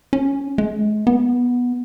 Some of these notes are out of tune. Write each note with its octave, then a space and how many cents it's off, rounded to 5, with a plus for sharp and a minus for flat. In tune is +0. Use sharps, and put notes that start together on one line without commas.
C#4 +5
G#3 +40
B3 -10